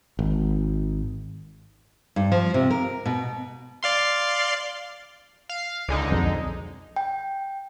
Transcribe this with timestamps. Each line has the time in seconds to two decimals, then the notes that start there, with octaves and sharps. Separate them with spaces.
0.19 G#1
2.16 G2
2.32 F3
2.54 C3
2.70 A#4
3.06 B2
3.83 D5 F5 C6
5.49 F5
5.89 C#2 D3 G#3 D#4
6.11 B1 F2
6.96 G5